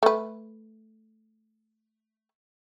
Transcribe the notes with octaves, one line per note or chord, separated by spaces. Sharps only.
A3 B4